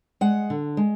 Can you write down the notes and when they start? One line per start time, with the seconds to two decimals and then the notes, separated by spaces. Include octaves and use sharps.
0.21 G#3 F#5
0.50 D3
0.77 G#3